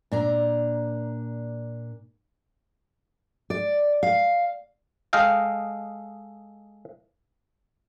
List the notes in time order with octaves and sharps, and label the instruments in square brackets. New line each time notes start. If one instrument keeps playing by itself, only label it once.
[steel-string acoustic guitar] A#2 D4 A#5
D5
F5
[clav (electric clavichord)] G#3 A4 D#5 F5 G5